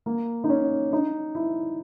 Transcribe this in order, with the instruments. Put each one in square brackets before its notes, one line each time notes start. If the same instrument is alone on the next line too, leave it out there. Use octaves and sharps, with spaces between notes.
[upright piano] A#3
D#4
C#4
D#4
E4